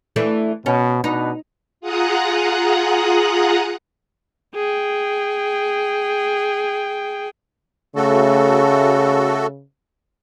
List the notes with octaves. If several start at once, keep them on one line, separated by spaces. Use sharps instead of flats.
E3 A3 D4
B2 C#4
B2 D4 D#4 B4
F4 G#4 F#5 A#5 D#6 F#6
G#4 G5
C#3 A3 F#4 A4